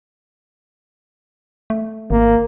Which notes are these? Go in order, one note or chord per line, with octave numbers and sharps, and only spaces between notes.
A3
G#1 A#3